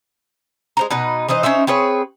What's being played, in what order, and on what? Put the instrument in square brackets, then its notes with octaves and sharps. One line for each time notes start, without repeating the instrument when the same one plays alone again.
[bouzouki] G#3 C5 A#5
B2 D#4 B4
E3 D#4 C5 D#5
C#4 D#4 C5 E5
C4 G#4 B4 C#5